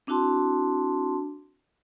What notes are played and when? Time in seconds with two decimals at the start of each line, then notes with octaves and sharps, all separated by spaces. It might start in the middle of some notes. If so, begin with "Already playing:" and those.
0.07 C4 D4 E4 F#4 A5 C6